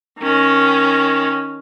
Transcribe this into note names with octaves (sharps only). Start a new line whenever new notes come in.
D#3 C#4